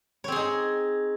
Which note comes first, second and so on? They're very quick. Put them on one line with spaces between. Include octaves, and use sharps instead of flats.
C#5 C4 G#4 D#4